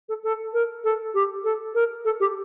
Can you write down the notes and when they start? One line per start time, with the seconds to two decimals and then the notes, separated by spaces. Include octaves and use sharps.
0.09 A4
0.23 A4
0.53 A#4
0.84 A4
1.14 G4
1.44 A4
1.75 A#4
2.05 A4
2.20 G4